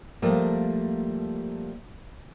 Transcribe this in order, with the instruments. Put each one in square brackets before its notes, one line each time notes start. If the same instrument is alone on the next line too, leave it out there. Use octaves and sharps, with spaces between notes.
[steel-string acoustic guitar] F3 G3 A3 A#3